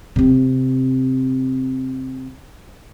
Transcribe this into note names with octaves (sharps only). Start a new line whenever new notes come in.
C3 C4